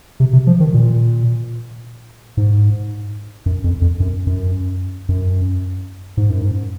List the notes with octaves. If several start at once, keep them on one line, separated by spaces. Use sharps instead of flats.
C3
C3
F3
D#3
A#2
G#2
F#2
F2
F2
F#2
F#2
F#2
G#2
F#2
G#2